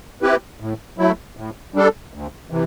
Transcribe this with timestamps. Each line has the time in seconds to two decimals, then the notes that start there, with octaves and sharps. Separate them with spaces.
0.22 C4 E4 G4 B4
0.60 A2
0.98 F#3 A3 E4
1.37 A2
1.74 G3 D4 A4
2.13 D2
2.50 C3 E3